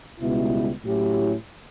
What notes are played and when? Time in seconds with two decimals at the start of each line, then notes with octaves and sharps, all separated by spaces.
0.20 C#2 B2 G3 B3 E4
0.83 A2 F#3 C#4 E4 G4